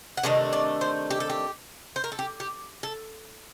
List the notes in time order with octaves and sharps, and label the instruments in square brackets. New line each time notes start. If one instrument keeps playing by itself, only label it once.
[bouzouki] F#5
C3 D#3 A3 D4 D#5
D5
C5
G4
A4
G4
C5
A#4
A4
G4
G4
A4